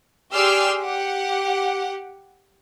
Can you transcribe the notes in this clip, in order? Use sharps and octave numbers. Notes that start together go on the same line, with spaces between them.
G4 G#4 D5 C6 E6 F6
G4 F#5